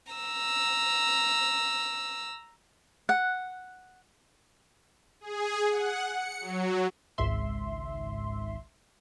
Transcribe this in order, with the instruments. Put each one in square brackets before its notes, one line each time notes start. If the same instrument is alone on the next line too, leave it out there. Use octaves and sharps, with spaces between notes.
[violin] A#5 E6
[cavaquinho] F#5
[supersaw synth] G#4
F#5
C#7
F#3
[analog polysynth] G#1 C#2 G#2 E5 C6